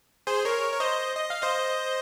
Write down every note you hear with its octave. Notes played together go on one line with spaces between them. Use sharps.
G#4 C5
A#4 C#5
C#5
C5 D#5
D#5
F5
C5 D#5